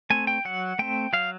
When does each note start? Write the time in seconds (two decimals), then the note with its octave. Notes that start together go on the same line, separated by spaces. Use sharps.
0.10 A3 C4 G#5
0.27 G5
0.45 F#3 F#5
0.79 A3 C4 G5
1.13 F#3 F5